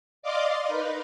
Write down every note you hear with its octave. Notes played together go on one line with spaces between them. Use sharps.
D5 D#5 F5 C6 D6
D#4 A#4 B4